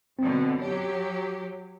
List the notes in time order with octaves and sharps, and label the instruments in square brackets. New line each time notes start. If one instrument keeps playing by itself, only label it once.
[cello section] F#2 B2 D3 [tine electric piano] C4
[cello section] F#3 G4 [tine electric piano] C#5